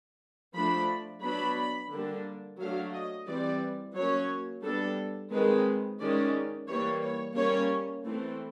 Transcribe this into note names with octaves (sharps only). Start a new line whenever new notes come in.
F3 A3 D4 B5
F#3 B3 D4 B5
D3 G3 A#3 D4
F#3 A3 D4 F5
D#5
E3 G3 C4 D5
F#3 A#3 C#4 C#5
G3 B3 D4 A4
D#3 G#3 C4 B4
D#3 G#3 C#4 D5
E3 G3 A#3 C#5
C#5
G3 A#3 C#4 C#5
E3 A3 C4